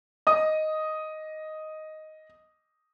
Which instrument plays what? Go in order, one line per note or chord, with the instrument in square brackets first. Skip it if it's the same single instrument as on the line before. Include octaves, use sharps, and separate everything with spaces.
[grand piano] D#5 D#6